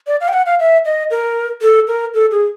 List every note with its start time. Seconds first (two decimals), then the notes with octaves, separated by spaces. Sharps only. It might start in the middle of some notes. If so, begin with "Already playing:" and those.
0.07 D5
0.21 F5
0.28 G5
0.33 F#5
0.46 F5
0.60 E5
0.85 D#5
1.11 A#4
1.62 A4
1.88 A#4
2.14 A4
2.31 G#4